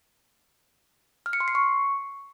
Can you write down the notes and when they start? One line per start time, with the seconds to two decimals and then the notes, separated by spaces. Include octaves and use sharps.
1.26 F6
1.33 C#7
1.40 C6
1.48 C7
1.55 C#6